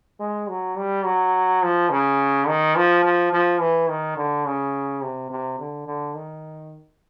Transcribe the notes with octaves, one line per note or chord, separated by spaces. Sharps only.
G#3
F#3
G3
F#3
F3
C#3
D#3
F3
F3
F3
E3
D#3
D3
C#3
C3
C3
D3
D3
D#3